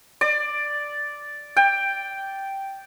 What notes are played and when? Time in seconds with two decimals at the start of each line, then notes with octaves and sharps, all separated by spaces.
0.21 D5
1.56 G5